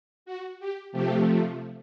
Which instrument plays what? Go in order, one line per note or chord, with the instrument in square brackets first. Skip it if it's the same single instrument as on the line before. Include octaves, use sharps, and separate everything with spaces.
[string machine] F#4
G4
C3 F3 A3 G4